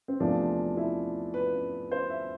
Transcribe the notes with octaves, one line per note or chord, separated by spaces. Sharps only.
C4
E2 C3 F3 A3 D4
E4
B4
C5
E5